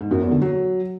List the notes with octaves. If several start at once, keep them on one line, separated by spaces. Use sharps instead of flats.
G#2
F#2
E2
D3
F#3